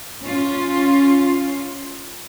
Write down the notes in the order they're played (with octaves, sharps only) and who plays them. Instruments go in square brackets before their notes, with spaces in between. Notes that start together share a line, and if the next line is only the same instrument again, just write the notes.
[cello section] C#4 F4